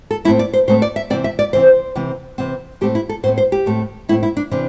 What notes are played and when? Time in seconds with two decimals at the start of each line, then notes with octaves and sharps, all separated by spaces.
0.11 A4
0.25 A2 A3 C4 E4
0.39 D5
0.53 C5
0.68 A2 A3 C4 C5
0.82 D5
0.96 E5
1.10 C3 E3 C4 D5
1.24 E5
1.39 D5
1.53 C3 E3 C4 C5
1.95 C3 E3 C4
2.38 C3 E3 C4
2.81 A2 A3 C4 G4
2.95 E4
3.09 A4
3.23 A2 A3 C4 C5
3.38 C5
3.52 G4
3.66 A2 A3 C4
4.09 A2 A3 C4 E4
4.23 E4
4.37 D4
4.51 C3 E3 C4 D4